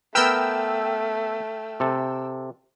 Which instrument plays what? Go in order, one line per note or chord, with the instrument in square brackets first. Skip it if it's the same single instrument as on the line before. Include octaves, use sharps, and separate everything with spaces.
[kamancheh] A3 [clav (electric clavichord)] B3 A#4 B4 [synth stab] G5 E6 F6
[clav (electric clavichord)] C3 A4